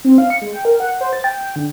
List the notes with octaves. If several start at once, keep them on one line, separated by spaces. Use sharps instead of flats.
C4
F5
C#7
G#3
G5
A#4
F#5
C5
A6
G5
G5
D3